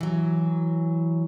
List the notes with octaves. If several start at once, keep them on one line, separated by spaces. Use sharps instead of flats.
E3 F#3